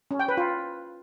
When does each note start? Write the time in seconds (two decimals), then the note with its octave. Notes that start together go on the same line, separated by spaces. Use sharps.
0.11 C#4
0.20 G5
0.28 B4
0.37 F4